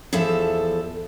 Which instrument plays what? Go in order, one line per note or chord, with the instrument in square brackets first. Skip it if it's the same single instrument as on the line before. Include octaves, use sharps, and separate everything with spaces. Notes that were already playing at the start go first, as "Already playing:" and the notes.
[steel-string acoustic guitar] E2 F3 A4 E5